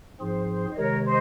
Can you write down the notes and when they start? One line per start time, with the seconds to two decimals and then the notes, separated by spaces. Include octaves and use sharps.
0.20 G#2 F3 C4 F4 G#4 C5
0.49 C5
0.72 D#5
0.76 C3 D#3 G#3 A#4 C#5
1.04 C5 D#5